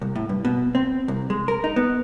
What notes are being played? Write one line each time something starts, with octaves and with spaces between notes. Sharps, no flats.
C2
A2
G2
B2
C4
C2
G#3
A#4
D#4
B3